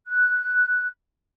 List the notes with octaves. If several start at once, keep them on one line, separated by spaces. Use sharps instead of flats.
F#6